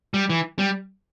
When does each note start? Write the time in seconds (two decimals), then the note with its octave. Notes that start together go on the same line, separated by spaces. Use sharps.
0.14 G3
0.30 E3
0.59 G3